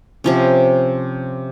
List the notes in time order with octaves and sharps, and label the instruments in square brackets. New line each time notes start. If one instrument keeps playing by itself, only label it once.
[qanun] C3 F3 C#4